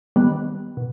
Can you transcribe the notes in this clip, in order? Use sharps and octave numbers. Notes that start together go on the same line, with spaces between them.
D#3 G3 B3
B2